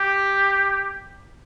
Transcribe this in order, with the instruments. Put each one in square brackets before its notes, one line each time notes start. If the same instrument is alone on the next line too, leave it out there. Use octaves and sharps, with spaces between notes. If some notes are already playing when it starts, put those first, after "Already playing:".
Already playing: [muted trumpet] G4